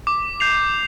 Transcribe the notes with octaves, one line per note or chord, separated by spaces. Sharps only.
D6
G6 C7 F7